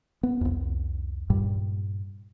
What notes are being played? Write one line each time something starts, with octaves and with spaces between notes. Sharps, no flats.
B3
C2 F2
G2 A#2 G3